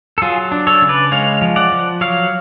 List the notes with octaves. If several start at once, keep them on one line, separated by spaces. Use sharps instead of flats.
A4
F#3 F4 G#4
D4
A4 C#5
C#3
B4 D5
G#3 C#5 F5
F3
D5 F#5
F3
F#3 C#5 F5